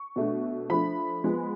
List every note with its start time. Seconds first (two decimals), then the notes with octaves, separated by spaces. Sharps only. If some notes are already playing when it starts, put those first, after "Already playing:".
Already playing: C#6
0.16 B2 A3 D4
0.70 F3 A3 D4 B5
1.24 F3 G#3 B3